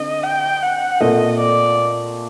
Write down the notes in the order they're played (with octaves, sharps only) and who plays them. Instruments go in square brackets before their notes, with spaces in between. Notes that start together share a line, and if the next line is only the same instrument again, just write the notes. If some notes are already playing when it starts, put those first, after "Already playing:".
Already playing: [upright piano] D3 C4 [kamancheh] D#5
[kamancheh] G5
F#5
[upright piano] A#2 A3 C4 [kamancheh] D#5
[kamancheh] D5